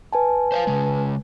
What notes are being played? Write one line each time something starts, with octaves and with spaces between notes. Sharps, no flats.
B4 G#5 A5
C5 E5 F5
C#3 G#3